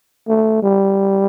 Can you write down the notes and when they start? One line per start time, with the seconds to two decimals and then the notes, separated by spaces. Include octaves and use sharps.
0.28 A3
0.63 G3